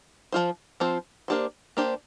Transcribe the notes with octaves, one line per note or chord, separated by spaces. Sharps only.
F3 C4 F4 C5
F3 C4 F4 C5
A#3 D4 G4 C5
A#3 D4 G4 C5